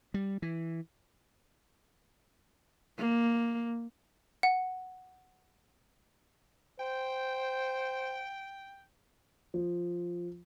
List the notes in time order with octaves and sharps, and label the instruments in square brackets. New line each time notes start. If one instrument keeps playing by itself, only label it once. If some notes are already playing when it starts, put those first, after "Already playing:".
[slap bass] G3
E3
[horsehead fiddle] A#3
[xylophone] F#5
[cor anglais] C5 [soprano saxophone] G5
[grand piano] F3